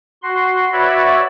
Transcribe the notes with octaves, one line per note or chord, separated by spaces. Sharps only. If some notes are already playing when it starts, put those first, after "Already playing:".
F#4 C6
F#4 B4 C#5 D5 E5 B5